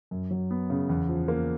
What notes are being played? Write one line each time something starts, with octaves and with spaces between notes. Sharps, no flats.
F#2
F#3
B3
C#3
E2
F3
A#3